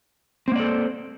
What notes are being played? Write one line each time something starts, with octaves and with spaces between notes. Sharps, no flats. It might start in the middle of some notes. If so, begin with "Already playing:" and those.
A#3 C4 A4 C5 D5